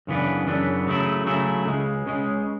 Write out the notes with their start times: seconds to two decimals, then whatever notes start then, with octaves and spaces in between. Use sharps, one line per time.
0.07 F#2 C#3 E3 B3 D4
0.47 F#2 C#3 E3 B3 D4
0.87 C#3 F#3 A3 E4
1.26 C#3 F#3 A3 E4
1.66 C#2 C#3 G#3
2.05 C#2 C#3 G#3